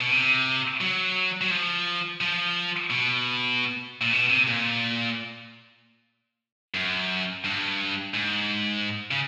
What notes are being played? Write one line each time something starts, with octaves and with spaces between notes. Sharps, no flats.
B2
C3
F#3
F#3
F3
F3
B2
A#2
B2
C3
A#2
F#2
G2
G#2
C#3